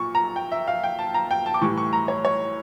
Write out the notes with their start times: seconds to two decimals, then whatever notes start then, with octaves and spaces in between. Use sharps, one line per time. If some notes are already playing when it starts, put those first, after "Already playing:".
Already playing: A#2 C#6
0.15 A#5
0.36 G5
0.52 E5
0.68 F5
0.84 G5
0.99 A5
1.14 A#5
1.31 G5
1.46 A5
1.54 D6
1.61 A2 E3 G3 C#6
1.77 C#6
1.93 A#5
2.08 C#5
2.25 C#5